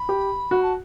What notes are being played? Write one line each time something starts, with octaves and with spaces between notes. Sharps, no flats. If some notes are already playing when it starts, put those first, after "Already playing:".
Already playing: B5
G4
F#4
A5